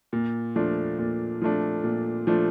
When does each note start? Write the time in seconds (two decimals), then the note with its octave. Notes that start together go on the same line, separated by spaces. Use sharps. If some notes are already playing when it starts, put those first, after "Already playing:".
0.13 A#2
0.56 F3 A3 D4
0.98 A#2
1.42 F3 A3 D4
1.84 A#2
2.27 F3 A3 D4